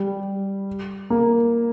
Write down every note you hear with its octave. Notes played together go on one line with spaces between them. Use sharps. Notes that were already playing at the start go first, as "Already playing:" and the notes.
Already playing: G3
A#3